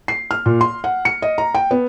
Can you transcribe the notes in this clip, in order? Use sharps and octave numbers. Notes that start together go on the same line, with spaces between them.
C7
F6
A#2
C6
F#5
C#7
D#5
A#5
G5
B3